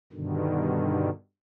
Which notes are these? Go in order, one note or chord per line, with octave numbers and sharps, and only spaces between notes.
G2 B2 D3 D#3